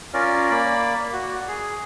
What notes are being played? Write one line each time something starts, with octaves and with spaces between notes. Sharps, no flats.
C#4 F4 A#4 D5
A#3 D5 B5
F#4
G#4